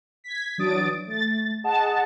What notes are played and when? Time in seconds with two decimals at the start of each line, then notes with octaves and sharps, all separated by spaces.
0.24 G#6 B6
0.58 E3 F#3 D4 D#6 A6 D7
1.07 A3 A6
1.64 G#4 D#5 F#5 A5